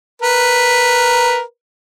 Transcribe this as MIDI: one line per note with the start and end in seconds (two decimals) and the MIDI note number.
0.22 1.41 70
0.22 1.41 71